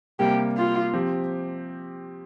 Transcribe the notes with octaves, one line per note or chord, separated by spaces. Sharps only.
C3 G3 A#3 G4
F4
F3 C4 G4